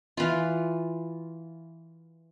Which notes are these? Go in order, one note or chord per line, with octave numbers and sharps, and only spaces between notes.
E3 F4